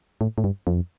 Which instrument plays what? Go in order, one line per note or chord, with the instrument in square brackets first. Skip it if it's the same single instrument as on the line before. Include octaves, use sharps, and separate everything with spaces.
[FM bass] A2
A2
G2
F2